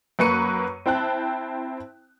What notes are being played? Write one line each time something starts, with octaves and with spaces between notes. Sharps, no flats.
F#2 A#3 B4 C#6 C#7 D#7
C4 E4 C5 G5 A5 F#6